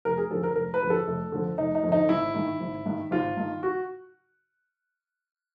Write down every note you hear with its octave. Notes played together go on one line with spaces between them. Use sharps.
F1 A#4
G#4
F2 D3 A4
A#4
F1 A#4
B4
F2 D3
A4
F1
F2 D3
F1 D#4
D#4
F2
D3 D#4
G#1 E4
G2 D#3
G#1
G2 D#3
G#1 F4
G2 D#3
F#4